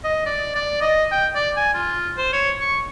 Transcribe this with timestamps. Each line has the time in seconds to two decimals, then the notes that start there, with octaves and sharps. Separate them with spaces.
0.04 D#5
0.26 D5
0.55 D5
0.81 D#5
1.12 G5
1.35 D5
1.56 G#5
1.74 F4
2.18 C5
2.33 C#5
2.61 C#6